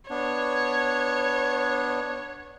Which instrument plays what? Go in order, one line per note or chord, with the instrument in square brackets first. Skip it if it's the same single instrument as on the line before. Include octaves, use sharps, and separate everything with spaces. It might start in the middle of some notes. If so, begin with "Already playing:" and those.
[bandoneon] B3 D4 [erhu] C#5